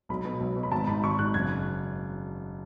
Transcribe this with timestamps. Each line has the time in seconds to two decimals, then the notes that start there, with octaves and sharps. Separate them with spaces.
0.09 B1 B5
0.25 B2
0.41 B1
0.56 B2
0.63 B5
0.72 G#1 A5
0.87 G#2 B5
1.03 G#1 C#6
1.19 G#2 F#6
1.34 F#1 G#6